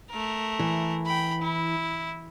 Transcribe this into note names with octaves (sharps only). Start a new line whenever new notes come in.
A3 A#4
E3
G5 B5
E4